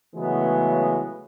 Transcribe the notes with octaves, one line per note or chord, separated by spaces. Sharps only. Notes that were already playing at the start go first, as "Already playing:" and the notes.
C#3 E3 F#3 G#3 A3 B3